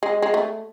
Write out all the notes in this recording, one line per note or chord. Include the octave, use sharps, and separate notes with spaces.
G#3
G#3
A3